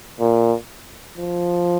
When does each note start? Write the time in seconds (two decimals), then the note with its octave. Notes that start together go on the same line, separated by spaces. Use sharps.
0.20 A#2
1.17 F3